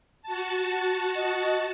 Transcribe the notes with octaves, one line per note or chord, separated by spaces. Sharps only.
F#4 A5
D#5